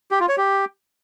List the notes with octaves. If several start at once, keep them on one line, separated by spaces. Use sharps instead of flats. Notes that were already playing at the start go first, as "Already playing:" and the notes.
G4
F4
C#5
G4